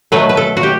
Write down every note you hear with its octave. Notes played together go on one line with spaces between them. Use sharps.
B2 F#3 A3 B4
B4
A4
F#4
G4